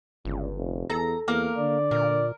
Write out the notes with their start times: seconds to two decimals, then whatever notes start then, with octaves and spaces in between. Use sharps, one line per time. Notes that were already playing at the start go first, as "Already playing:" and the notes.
0.25 G1 C#2
0.56 F1
0.90 E2 A4 A#5
1.28 E2 A#3 A#4
1.58 D3 D5
1.91 A#2 A#4